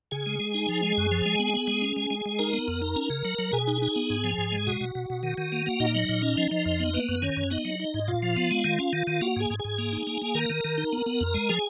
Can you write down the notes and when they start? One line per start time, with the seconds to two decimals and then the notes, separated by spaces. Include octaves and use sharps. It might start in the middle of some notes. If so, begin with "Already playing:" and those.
0.11 C#3 G#4 G#5
0.26 G#3
0.40 G#3
0.54 D#4
0.68 F3
0.83 G#3
0.98 F#2
1.11 F3
1.26 G#3
1.39 B3
1.54 B3
1.67 G#3
1.82 C#4
1.96 G#3
2.10 G#3
2.26 G#3
2.39 D#4 A#4 A#5
2.54 B3
2.68 F2
2.82 D#4
2.96 C#4
3.10 C#3
3.25 F#3
3.38 F#3
3.53 B2 G#4 G#5
3.67 D#4
3.82 D#4
3.96 B3
4.10 G#2
4.24 F3
4.38 G#2
4.52 G#3
4.67 B2 F#4 F#5
4.81 B2
4.95 B2
5.10 B2
5.23 D#3
5.38 D#3
5.52 A#3
5.66 A#3
5.80 A#2 D#4 D#5
5.95 F#3
6.09 A#2
6.22 C#4
6.37 F3
6.51 F3
6.66 F2
6.80 B3
6.94 A#3 B3 B4
7.09 F#2
7.22 D#3 C#4 C#5
7.37 F#2
7.51 B3 D#4 D#5
7.65 F#3
7.80 D#4
7.94 G#2
8.08 A#2 F4 F5
8.23 F3
8.36 B3
8.51 G#3
8.64 D#3
8.79 C#4
8.93 D#3
9.07 D#3
9.21 A#3 F#4 F#5
9.36 G#2 G#4 G#5
9.50 G#2
9.59 G#4 G#5
9.65 G#2
9.78 A#3
9.93 D#4
10.07 A#3
10.22 A#3
10.35 D#3 A#4 A#5
10.50 D#3
10.64 D#3
10.78 D#4
10.93 B3
11.06 B3
11.21 F2
11.34 G#3
11.49 F3 G#4 G#5